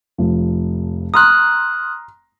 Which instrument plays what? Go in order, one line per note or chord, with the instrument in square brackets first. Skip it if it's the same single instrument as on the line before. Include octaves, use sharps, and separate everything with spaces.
[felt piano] F1 F3
[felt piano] A#5 C6 [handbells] D#6 F6 F#6